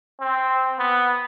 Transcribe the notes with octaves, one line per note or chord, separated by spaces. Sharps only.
C4
B3